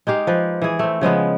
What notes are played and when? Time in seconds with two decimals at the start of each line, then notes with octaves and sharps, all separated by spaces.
0.07 G#3 D#4 G4 F5
0.27 F3 B4
0.62 E3 G#4
0.79 A3 C4
1.01 C#3 F3 G#3 B3